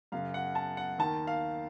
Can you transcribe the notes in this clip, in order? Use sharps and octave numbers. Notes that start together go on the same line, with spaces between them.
F#2 C#3 F5
F#5
A5
F#5
D#2 D#3 A5
F5